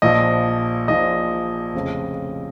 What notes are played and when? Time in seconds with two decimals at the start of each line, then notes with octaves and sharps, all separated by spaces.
0.02 A#1 A#2 F3 D#5
0.88 A#1 A#2 F3 D#5
1.74 F1 F2 C#3